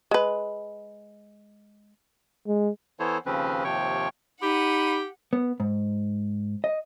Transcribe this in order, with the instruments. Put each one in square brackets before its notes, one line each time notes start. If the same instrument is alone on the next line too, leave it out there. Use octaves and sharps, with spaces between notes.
[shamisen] G#3 B4
[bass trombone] G#3
[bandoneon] E3 B3 E4 A4 C5 C#5
D#2 C#3 F3 C4 C#4 B4
D#2 C3 F3 C#5 G5 C#6
[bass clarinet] D#4 [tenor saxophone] G4 [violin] F#5 D#7 [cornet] B5
[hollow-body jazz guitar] B3
G#2
D#5